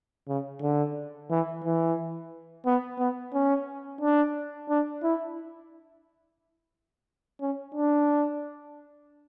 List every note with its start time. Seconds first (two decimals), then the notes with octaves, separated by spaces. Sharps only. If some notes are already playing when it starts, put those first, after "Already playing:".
0.28 C#3
0.62 D3
1.30 E3
1.64 E3
2.66 B3
2.99 B3
3.33 C#4
4.01 D4
4.69 D4
5.03 E4
7.40 C#4
7.74 D4